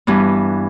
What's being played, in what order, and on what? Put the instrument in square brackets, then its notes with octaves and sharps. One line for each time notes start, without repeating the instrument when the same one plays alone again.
[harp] G2 E3 B3